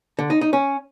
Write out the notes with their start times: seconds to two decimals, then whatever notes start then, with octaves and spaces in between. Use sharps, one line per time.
0.19 D3
0.30 D#4
0.41 D#4
0.53 C#4